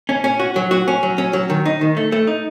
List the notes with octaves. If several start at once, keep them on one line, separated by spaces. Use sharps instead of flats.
C#4
C#4
F#4
F#3
F#4
C#4
F#3
C#4
F#3
D#3
D#4
D#3
A3
A3
D#4